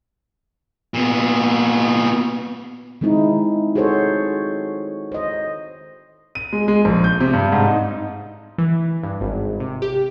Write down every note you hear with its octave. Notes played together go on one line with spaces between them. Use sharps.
A#2 B3
D#3 G#3 C4 D#4 E4
F#4 G#4 A4 C5 C#5
C5 D#5
D#7
G#3
G#3
A#1
G6
C3
G2
G#2
D#4
E3
G2
G#1
C3
G4